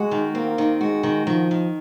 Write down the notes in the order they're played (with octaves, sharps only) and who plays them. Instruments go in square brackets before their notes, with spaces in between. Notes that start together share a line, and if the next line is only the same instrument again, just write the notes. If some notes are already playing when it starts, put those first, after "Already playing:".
Already playing: [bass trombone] G#3 [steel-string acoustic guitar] F#4
[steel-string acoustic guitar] D#3
[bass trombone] A#3 [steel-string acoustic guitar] C4
[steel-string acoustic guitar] D#3
[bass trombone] G#3 [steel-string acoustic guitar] F#4
[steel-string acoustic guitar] D#3
[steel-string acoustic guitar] D#3 [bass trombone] F3
[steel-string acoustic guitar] D#3